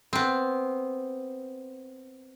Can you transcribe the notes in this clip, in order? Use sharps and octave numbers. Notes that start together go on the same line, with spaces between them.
B3 C4